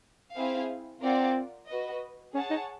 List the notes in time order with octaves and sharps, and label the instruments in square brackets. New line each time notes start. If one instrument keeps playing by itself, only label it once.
[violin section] C4 E4 G#4 C5 F5
[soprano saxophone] C4 [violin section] F4 A#4 D5 F#5
[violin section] F#4 B4 D#5
[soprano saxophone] C#4 [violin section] G#4 C#5 F#5 A5
[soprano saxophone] D#4